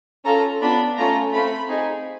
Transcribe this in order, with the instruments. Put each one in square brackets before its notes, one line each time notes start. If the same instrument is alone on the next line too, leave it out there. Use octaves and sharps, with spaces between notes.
[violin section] C#4 F4 A4 A#5
B3 D4 F4 B5
A3 C#4 F4 A4 A#5
A3 C4 F4 B5
C4 D#4 G#4